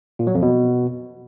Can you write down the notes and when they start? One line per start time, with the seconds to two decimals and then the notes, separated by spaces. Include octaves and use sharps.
0.19 A#2
0.27 F#3
0.35 F2
0.42 B2